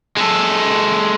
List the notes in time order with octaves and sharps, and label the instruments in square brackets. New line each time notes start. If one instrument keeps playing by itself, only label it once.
[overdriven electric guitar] G#3 A4